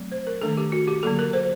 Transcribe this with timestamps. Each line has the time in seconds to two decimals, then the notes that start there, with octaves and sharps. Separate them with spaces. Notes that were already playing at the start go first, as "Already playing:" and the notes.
Already playing: F#3 A3 C4
0.12 C5
0.27 A#4
0.42 D#3 A3 D4 A4
0.57 G4
0.72 F#4
0.88 G4
1.03 D3 F#3 A#3 A4
1.19 A#4
1.33 C5